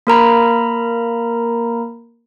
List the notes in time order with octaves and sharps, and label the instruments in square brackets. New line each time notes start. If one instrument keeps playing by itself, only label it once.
[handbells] A#3 A#4 A#5 B5